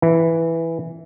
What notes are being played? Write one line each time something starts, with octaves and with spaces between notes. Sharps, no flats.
E3